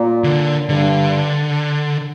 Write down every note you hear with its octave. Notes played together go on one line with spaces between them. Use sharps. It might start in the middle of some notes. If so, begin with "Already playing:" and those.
Already playing: A#2
D3
G2 D3